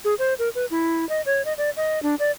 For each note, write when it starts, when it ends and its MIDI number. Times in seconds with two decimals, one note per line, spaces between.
0.05 0.15 68
0.19 0.34 72
0.39 0.49 70
0.55 0.66 71
0.71 1.07 64
1.09 1.22 75
1.26 1.44 73
1.45 1.53 75
1.58 1.70 74
1.77 2.02 75
2.03 2.15 62
2.19 2.31 74